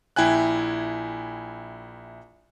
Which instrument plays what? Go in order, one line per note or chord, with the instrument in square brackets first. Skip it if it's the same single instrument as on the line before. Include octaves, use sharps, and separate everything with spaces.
[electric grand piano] A#1 E4 G5 G#5 F#6